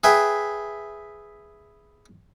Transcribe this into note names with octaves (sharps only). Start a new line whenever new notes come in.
G#4 B4 E5 G5